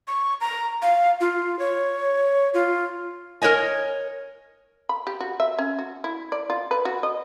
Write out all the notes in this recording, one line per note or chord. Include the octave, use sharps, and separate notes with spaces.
C#6
A#5
F5
F4
C#5
F4
A#4 B4 C#5 D#5 G#5
B5
G4
F#4
E5
C#4
F#4
E4
D5
F4
B4
F#4
D#5